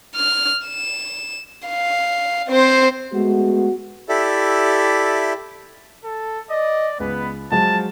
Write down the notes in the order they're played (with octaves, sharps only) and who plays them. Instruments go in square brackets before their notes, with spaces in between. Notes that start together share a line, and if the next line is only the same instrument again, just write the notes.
[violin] F6
E7
F5
C4 C5
[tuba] G#3 [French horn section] A3 B3 F#4
[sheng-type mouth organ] E4 G4 A4 D5 E5
[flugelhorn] A4
[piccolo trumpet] D5 [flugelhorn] D#5
[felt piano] C#2 [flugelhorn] B3 [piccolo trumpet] B4
[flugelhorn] F3 [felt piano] F#3 G#3 [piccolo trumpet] A5